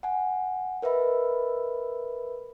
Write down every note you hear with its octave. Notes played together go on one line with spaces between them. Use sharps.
F#5 G#5
A#4 B4 D#5 E5 B5